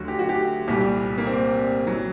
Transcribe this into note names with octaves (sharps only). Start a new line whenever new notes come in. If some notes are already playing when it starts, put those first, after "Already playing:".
Already playing: D2 D3 F#3 F#4
G4
F#4
G4
C2 A#2 G3 G4
A#3
C4
F#3